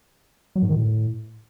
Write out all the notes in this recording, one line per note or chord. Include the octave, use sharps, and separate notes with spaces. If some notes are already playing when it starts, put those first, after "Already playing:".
F#3
G#2
D#3
A2